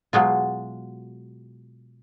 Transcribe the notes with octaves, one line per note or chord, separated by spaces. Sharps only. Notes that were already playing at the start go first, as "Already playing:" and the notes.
B2 F#3 G#3 F4